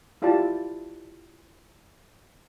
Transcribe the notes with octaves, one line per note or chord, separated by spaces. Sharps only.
E4 F4 G4 D5 A5